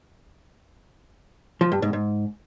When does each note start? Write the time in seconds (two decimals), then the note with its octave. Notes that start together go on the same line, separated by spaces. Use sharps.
1.61 F3
1.72 G2
1.82 G#2
1.93 G#2